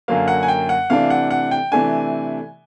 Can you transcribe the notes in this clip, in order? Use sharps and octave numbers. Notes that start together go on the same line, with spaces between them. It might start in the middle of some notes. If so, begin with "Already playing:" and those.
F#2 D3 F#3 A#3 F5
F#5
G#5
G5
F#5
C3 E3 A3 D4 F5
F#5
F#5
G5
C3 E3 A3 D4 G#5